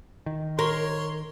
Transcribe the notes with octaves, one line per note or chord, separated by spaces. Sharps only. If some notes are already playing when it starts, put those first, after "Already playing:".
D#3
A#4 C#5 C6